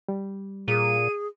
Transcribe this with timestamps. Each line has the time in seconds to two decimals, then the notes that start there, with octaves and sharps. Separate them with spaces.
0.08 G3
0.68 A#2 G#4 D#7